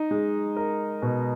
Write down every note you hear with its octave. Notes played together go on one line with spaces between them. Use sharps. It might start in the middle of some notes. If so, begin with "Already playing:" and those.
Already playing: D#4
G#3
A#4
B2